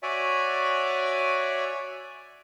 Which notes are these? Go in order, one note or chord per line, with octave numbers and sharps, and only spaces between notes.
F#4 C#5 D5 E5 G#5